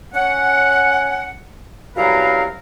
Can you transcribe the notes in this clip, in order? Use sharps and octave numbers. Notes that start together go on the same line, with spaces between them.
C#4 F#5
C2 F#2 F#3 A#4 B4 F5